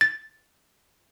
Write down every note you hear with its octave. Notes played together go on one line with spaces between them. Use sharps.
A6